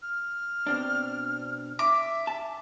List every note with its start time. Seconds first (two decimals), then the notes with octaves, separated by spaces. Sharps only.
0.02 F6
0.67 B2 C4 D4
1.79 E5 D6
2.27 A5